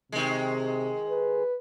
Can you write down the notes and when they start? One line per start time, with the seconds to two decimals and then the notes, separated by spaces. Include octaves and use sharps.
0.12 C3 D#3 G#3
1.09 B4